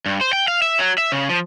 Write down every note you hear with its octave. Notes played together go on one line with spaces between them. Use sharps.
G2
C5
G5
F5
E5
F#3
E5
C#3
F3